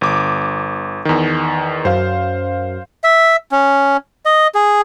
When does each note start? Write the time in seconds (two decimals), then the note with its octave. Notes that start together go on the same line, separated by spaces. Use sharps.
0.01 G1 D6
1.05 E2 D#3
1.85 F#2 C5 F5
3.04 E5
3.52 C#4
4.25 D#5
4.55 G#4